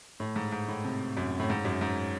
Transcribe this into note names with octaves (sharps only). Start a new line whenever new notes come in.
A2
G#2
G#2
A2
C3
F#2
A2
G#2
F#2
G#2